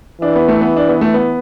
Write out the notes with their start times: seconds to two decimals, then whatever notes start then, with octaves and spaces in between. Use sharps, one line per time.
0.21 E3 D4
0.36 B3
0.48 A3
0.61 B3
0.77 D4
0.89 B3
1.01 A3
1.14 B3